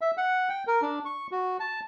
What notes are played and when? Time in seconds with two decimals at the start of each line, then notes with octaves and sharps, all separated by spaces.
0.01 E5
0.17 F#5
0.49 G5
0.67 A#4
0.82 D4
1.05 C#6
1.31 F#4
1.60 A5